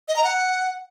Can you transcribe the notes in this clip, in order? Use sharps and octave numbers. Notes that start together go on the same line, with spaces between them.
D#5
A#5
F#5